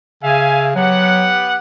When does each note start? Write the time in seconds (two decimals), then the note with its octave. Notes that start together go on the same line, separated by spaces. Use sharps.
0.23 C#3 E5 F5 G#5
0.75 F#3 B3 G4 F#5